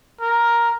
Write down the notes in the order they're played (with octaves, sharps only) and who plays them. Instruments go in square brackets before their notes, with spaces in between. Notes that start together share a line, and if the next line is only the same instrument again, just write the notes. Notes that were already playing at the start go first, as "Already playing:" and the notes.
[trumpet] A#4